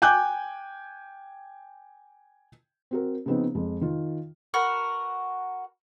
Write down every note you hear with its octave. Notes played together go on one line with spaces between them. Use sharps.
G5 G#5 D6 F#6 G6
C4 F#4 A#4
C#3 F3 B3 C4 D#4
F2 G#3
D#3 F4
F#4 A#4 B4